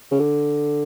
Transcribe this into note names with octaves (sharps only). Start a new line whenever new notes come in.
C#3
D3